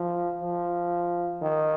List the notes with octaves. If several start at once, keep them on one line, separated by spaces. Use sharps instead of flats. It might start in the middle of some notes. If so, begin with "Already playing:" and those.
Already playing: F3
F3
D#3